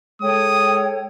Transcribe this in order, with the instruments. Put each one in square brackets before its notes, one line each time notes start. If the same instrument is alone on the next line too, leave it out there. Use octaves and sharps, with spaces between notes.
[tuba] G#3 [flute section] A4 C#5 G5 [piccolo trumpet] D#6